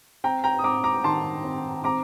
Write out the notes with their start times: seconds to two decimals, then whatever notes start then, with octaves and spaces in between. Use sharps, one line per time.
0.24 C4 G5 A#5
0.44 G5 A#5
0.59 D#6
0.64 C4 A#5 D6
0.84 A#5 D6
1.04 D#3 A5 C6
1.44 C4
1.84 C4 A#5 D6